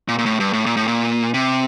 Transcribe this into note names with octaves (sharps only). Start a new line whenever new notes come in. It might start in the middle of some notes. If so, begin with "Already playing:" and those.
A#2
A#2
A2
G2
A2
A#2
A2
A#2
C3